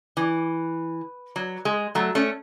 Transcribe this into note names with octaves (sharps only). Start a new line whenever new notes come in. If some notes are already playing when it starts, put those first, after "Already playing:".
E3
F#3
G#3
F#3 A3
A3 C#4